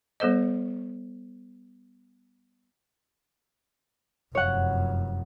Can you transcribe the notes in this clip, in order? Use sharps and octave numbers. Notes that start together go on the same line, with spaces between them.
G3 B3 A4 C5 D#5
F1 F#2 C#5 F#5